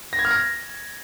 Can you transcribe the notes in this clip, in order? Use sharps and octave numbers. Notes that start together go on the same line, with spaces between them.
A#6
G#6
F6
A#6